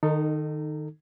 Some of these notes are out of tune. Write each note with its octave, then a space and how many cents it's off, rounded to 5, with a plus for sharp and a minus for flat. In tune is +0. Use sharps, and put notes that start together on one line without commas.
D#3 -25 D#4 -10 A4 +20